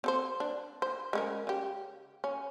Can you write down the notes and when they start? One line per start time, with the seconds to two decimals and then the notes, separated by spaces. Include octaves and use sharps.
0.04 C4 A4 C5
0.40 D4
0.82 C5
1.13 G#3 C#4 A#4
1.47 C#3 G4
2.24 C#4